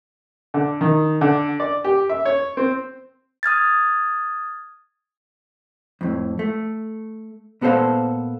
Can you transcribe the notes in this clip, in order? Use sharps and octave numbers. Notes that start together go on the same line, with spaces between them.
D3
D#3
D3
D5
G4
E5
C#5
C4
D#6 F6 G#6 A6
F2 A2
A3
A#2 B3 G#4 A4 C5 F5